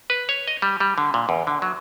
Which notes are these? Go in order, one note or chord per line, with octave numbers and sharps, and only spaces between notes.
B4
C#5
D#5
G3
G3
D3
A#2
E2
D3
F#3